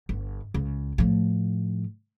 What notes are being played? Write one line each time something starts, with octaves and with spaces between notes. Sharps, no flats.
G1
C#2
A2 F3